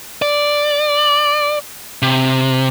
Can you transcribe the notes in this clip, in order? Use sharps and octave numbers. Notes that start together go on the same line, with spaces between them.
D5
C3